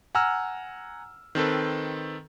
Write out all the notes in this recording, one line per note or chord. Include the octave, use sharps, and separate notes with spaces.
F#5 G#5 A#5 E6 F6
D#3 C4 A4 B4